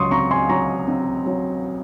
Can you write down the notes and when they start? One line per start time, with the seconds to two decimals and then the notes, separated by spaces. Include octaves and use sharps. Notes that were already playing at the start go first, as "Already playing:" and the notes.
Already playing: C#2 F#3 C6 C#6 D#6
0.11 C4 A#5 C#6
0.31 G#5 C6
0.49 F#3 A#5 C#6
0.88 C4
1.26 F#3